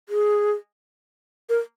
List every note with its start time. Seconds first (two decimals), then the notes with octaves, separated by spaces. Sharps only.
0.09 G#4
1.49 A#4